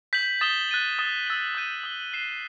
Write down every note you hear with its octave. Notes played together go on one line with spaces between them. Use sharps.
G6 B6 F#7
D#6 A6 E7 G7
F#6 A6 D#7 F#7
D#6 A6 E7 G7
E6 A6 D#7 F#7
D#6 G6 D#7
D#6 A6 E7 G7
F#6 C7 E7 G7